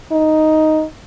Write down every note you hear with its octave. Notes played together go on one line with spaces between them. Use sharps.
D#4